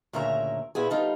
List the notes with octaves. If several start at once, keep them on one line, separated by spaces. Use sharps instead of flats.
D2 A#2 C#3 A#4 E5 A#5
A#2 B3 E4 G#4
G3 D#4 F4 A4